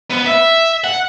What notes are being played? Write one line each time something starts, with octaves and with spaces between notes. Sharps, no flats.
B3
E5
F#5